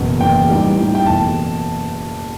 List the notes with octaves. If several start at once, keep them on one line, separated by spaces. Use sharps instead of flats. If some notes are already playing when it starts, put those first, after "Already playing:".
Already playing: F#1 E2 B2
F#1 E2 B2 G5
A2 E3 G3 D#4
A2 E3 G3 D#4
G5
F#1 E2 B2 A3 A5